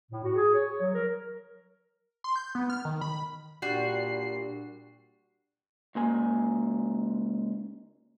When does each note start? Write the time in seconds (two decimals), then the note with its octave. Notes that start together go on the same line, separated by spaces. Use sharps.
0.11 A2
0.24 F#4
0.35 G#4
0.54 C#5
0.81 F#3
0.94 A#4
2.24 C6
2.36 G6
2.55 B3
2.70 F6
2.85 D#3
3.01 B5
3.62 A#2 G3 D4 F#4 G4 C7
5.95 C#2 A#3 G#5